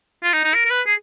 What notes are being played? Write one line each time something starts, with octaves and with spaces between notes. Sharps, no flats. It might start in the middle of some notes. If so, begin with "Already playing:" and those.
F4
D#4
D#4
A#4
A#4
B4
G#4